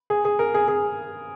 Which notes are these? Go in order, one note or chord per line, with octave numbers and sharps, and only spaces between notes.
G#4
G#4
A#4
G#4
G#4